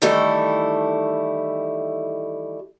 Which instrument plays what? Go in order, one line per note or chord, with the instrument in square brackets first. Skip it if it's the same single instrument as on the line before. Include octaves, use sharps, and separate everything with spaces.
[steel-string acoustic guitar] D#3 E3 G3 A3 E4 A4